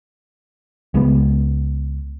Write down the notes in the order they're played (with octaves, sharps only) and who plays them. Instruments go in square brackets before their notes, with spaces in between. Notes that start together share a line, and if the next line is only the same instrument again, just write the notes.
[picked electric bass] C#2 G#3 B3